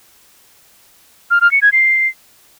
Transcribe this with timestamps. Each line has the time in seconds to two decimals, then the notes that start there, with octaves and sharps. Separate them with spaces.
1.31 F6
1.41 F6
1.51 C#7
1.62 G#6
1.72 C7